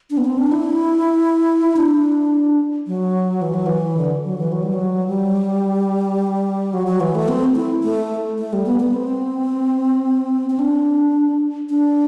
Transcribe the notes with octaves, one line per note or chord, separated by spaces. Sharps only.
D4
B3
C4
D4
E4
D4
F#3
E3
F#3
E3
D3
F#3
E3
F#3
G3
F#3
G3
F#3
F#3
E3
A3
C4
E4
A3
A3
G3
B3
B3
C4
C4
D4
D4